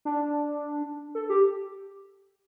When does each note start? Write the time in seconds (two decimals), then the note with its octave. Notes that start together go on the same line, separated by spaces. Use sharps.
0.05 D4
1.15 A4
1.30 G4